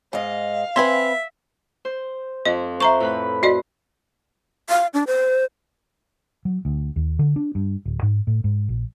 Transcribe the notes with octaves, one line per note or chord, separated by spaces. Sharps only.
G#2 D#5 F5
C4 B4 C5 E5 G#5 B5
C5
F2 D#5
C5 E5 A#5 C#6
A2 B4 B5
F#4 D5 D#5
F5
D4
C5
F#3
D2
D#2
D3
D4
G2
D1
G#2
A2
G#2
A#1